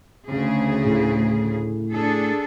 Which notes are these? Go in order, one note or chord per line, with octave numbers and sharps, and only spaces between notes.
D2 C#3 G#4
A2
D4 G#4 A4